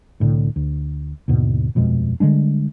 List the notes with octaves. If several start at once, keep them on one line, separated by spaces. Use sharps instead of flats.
C2 A2 D3
D2
D#2 G#2 B2 D3
D#1 F2 B2 G#3
D3 G3 G#3 D4